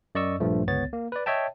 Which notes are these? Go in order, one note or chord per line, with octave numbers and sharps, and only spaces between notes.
F#2 D5 D#5 C#6 E6
A#1 G2 F3 A3
G1 C#2 B3 C#5 A6
A#3
B4 D5
C#5 D#5 E5 G5 A5